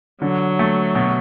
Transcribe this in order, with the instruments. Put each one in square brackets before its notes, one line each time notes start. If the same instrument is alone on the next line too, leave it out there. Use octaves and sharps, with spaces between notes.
[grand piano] D3 [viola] F#3
[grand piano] A3
B2